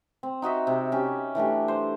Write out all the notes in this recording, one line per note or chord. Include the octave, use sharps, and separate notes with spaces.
C4
D#4 F#4 D#5 E5
C3
C#4 G4
E3 A3 D4 G4
C5